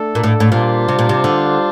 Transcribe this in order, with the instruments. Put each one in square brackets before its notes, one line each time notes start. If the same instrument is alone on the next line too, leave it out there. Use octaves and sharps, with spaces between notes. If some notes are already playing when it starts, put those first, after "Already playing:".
Already playing: [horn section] A3 D4 A4
[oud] A#2
A2
A2
[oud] A#2 [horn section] G3 D4 F4 C5
[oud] C3
A#2
C3
D3